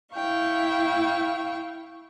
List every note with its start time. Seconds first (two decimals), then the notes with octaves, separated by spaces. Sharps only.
0.13 E4 F5 G5 C#6